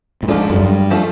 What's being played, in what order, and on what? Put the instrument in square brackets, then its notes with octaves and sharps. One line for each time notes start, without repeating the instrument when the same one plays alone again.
[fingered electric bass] A2
[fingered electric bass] G#2 [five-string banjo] F3 A3 D4 F4 A4
[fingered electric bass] F#2
G2
[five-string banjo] F3 A3 D4 F4 A4